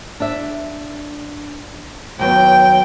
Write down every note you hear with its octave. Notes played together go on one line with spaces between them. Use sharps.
D4 E5
D#2 F#3 B3 G5